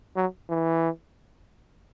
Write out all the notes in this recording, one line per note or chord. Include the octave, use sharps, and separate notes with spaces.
F#3
E3